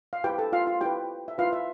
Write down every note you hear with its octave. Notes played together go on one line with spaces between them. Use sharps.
F5
E4 G4 B4 G5
A4 A5
F4 F5
F4 F5
E4 G4 B4 G5
E5
E4 F4 B4 F5
E5